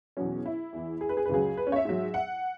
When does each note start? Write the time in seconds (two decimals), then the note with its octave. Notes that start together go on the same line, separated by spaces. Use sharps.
0.17 E2 B2 F#3 C#4
0.46 E4
0.73 E2 E3
1.01 G#4
1.09 B4
1.17 G#4
1.25 B4
1.29 C#2 C#3 F#3 G#4
1.57 B4
1.67 C#4
1.72 C#5
1.76 E5
1.85 G#2 F#3
2.14 F#5